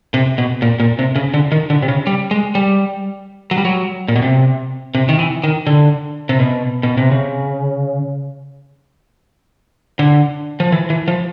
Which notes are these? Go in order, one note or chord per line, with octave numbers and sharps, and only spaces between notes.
C3
B2
A#2
A#2
C3
C#3
D3
D#3
D3
C3
C#3
G3
G#3
G3
F#3
G3
F#3
A#2
B2
C3
C3
D#3
E3
D#3
D3
C3
B2
B2
C3
C#3
D3
F3
E3
E3
F3